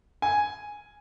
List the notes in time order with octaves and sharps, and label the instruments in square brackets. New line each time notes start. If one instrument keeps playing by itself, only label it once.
[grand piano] G#5